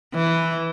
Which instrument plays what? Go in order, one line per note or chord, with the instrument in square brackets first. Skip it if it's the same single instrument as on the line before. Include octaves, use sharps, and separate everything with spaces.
[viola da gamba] E3